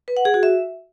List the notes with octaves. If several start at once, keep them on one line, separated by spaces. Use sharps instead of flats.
B4
F#5
G#4
F#4
E5